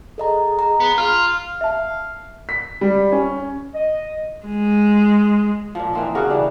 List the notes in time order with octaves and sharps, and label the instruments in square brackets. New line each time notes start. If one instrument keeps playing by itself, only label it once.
[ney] G#4 [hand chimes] A4 D#5 A#5
[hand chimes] A#5
[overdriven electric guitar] B3
[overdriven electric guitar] F4 [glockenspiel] F6
[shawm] F5
[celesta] E5 A5
[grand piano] B6
G3
C#4
[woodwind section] D#5
[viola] G#3
[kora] A#2 F3
E3 A#3 C4 D#4
C#3 F#4 G4 A#4
E3 G3 D4